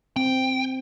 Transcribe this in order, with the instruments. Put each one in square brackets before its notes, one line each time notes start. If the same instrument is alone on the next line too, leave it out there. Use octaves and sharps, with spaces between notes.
[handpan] C4 [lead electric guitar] G5